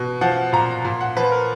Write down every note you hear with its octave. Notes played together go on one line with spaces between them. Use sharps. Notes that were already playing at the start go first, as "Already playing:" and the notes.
Already playing: B2
F3 F#5
A#2 A#5
A#2
F#5
F3 B4
A#4